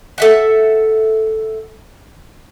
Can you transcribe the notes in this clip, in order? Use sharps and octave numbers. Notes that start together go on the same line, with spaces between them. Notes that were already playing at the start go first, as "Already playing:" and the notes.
A4 E5 F#5